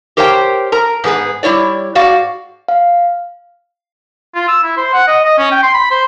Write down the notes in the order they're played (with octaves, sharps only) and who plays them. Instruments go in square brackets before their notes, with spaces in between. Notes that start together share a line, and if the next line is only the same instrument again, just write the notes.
[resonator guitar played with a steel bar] G4 A#4 C5 C#5 F5 G5
A#4 A#5
G#2 B3 G#4 B4
G3 E4 C#5 D5
G#2 F#4 D5 F5
[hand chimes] F5
[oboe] F4
E6
E4
C5
F#5
D#5
D#5
C#4
G5
C6
B5
C5